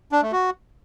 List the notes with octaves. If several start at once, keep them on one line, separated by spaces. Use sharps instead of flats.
D4
A3
F#4